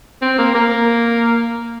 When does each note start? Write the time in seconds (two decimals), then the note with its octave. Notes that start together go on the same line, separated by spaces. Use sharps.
0.22 C4
0.38 A#3
0.54 A#3